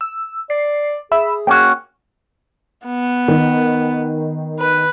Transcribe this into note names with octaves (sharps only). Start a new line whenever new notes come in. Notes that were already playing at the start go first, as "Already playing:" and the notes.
E6
D5 C7
G#4 E5 B5 E6
A#3 C#4 F#4 G5
B3
D#3
B4